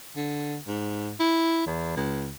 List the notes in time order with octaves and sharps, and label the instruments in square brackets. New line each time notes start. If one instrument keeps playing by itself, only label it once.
[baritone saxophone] D3
G#2
E4
E2
C#2